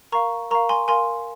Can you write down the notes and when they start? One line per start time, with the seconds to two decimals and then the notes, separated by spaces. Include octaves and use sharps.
0.12 A#4 F5 A#5 C#6
0.51 A#4 F5 A#5 C#6
0.69 G#5 C6
0.88 A#4 F5 G#5 C6